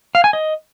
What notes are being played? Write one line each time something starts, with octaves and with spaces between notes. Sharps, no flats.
F5
G#5
D#5